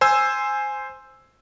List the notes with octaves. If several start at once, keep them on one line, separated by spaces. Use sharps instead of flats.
C5 G#5 E6